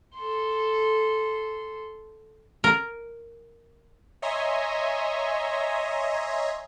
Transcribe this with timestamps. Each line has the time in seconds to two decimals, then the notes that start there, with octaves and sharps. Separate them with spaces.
0.16 A4 C6
2.64 A#4
4.22 C#5 D#5 E5 G#5 A#5 C6